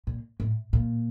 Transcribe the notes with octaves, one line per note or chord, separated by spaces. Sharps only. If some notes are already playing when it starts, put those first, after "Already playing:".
A#2
A2
A#2